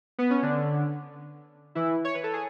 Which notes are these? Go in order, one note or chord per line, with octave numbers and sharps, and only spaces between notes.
B3
C#4
D3 D4
E3 E4
C#5
B4
A4
G#4